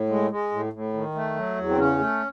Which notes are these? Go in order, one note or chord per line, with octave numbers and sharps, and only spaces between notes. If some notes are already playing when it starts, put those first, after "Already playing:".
Already playing: A2
G#3
G#3
A2
A2
D#3
A3
F#3
E2
C4
C#3 C#4
A3